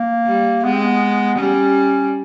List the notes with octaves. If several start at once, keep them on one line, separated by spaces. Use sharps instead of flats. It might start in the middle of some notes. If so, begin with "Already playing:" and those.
Already playing: A#3
G3
G#3 B3
C4
B3
G3 C#4